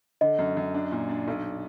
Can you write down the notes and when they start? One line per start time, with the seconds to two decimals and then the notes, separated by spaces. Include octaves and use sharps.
0.21 D3 D#5
0.39 F#2
0.57 F#2
0.74 D4
0.92 A#2
1.09 D4
1.28 B1